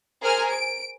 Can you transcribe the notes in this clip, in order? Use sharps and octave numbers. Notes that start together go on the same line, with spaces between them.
G#4 A#4 C5 G#5 F6
D7